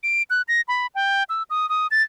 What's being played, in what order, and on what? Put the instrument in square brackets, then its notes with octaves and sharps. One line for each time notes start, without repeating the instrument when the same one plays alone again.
[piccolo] D7
F#6
A#6
B5
G5
E6
D#6
D#6
A6